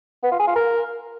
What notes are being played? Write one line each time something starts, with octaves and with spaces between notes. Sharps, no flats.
B3
F4
G#4
F4
A#4